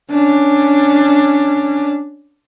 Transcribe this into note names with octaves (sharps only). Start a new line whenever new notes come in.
C#4 D4